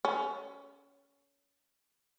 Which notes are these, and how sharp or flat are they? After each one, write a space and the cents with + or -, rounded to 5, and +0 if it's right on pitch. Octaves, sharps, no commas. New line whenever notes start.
C#4 +20 A4 +0